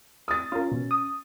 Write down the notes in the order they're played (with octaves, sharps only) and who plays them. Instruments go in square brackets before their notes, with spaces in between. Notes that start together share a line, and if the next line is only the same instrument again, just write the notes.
[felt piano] D#6 A6
[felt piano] C#4 [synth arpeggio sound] F4 A#4
[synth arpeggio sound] B2
D#6